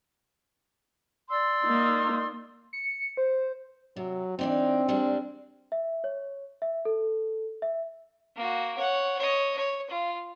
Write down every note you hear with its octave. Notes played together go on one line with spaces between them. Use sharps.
D5 C6 E6
A#3 D#4
C#7
C5
C3 F#3
E3 C4 D4 D#4
G3 G#3 D4
E5
C#5
E5
A4
E5
A#3 F#4
C#5 F#5
C#5 D#5
C#5
F4